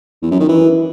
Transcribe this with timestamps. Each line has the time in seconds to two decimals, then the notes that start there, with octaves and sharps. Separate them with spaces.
0.22 E2
0.31 F#2
0.40 D#3
0.49 E3